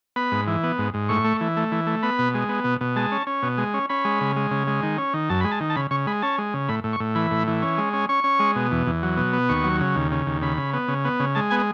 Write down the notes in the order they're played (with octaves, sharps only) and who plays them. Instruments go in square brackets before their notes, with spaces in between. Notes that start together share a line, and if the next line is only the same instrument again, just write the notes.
[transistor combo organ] B3 B5
G#2
E3
B3
G#2
G#2
A2 C#6
A3
E3
A3
E3
A3
B3 B5
B2
G#3
B3
B2
B2
G#3 A5
C#4
C#4
B2
G#3
C#4
C#4 B5
G#3
C#3
G#3
C#3
G#3
D#3
C#4
D#3
F#2 A5
G#3 B5
A5
D#3
A5
C#3 B5
C#3 C#6
G#3 B5
C#4 A5
G#3
C#3
A2 B5
A2
C#6
A2
E3 B5
A2
E3
C#4
G#3
C#4
C#4 C#6
C#4
G#3
B2
E2
E2
F#3
B2
B3
D#2 C#6
F#3
C#3
D#2
C#3
D#2
C#3 B5
C#3
B3
C#3
B3
C#3
G#3 A5
B3 G#5